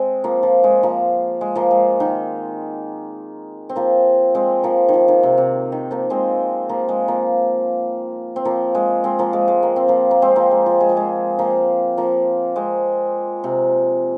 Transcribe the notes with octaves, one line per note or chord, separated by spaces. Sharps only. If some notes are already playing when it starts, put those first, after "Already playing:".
Already playing: G#3 C4
F3 A#3
F3
G#3
F3 A#3
G#3
F3 A#3
G#3
D#3
C4
F3 A#3
G#3 C4
F3 A#3
D#3 F3
D#3
C3
C3
D#3
F3 A#3
G#3 C4
F3 A#3
G#3
F3 A#3
C4
F3 A#3
G#3
G#3 C4
F3 A#3
G#3
G#3
A#3
C4
F3 A#3
A#3
G#3 C4
F3 A#3
G#3
F3
G#3
F3
G#3
F3 A#3
F3 A#3
G#3 C4
C3